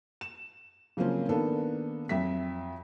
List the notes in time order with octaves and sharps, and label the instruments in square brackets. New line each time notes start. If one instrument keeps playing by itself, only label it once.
[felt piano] E7
C#3 F3 F#3 A#3 C4 C#4
D#3 A#3 B3 D4 A4
F2 F#3 E5 B6